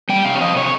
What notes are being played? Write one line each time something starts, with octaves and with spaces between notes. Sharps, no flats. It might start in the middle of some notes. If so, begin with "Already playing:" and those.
G3 G5
C3 F5
C#5
F3 D#5
C3 C#5